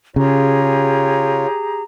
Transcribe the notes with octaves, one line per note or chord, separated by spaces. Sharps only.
C#3 F4 G4 G#4 C#5 A#5